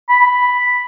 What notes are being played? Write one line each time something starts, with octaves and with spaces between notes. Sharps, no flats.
B5